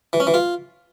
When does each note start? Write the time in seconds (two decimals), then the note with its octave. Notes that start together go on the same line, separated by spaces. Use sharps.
0.13 E3
0.20 C#4
0.27 E3
0.34 F4